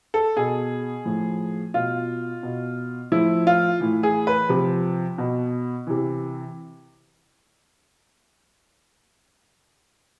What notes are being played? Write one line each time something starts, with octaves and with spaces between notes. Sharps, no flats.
A4
B2 G#4
A2 F3
B2 F4
B2
A2 F3 E4
F4
A2 E3
G#4
B4
C3 F3
B2
C3 E3